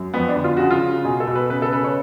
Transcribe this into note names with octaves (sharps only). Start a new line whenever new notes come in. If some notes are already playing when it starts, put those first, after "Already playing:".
Already playing: F#2
F2 B3
D4
D3
F4
C#3 F#4
F4
C#3
B2 G#4
A4
B2
B4
C#3 B4
A4
C#3 B4
C#5